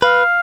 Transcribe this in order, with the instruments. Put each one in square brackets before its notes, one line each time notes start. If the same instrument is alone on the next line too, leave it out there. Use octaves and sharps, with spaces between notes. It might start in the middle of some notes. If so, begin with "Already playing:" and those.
[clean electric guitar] B4 [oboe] F5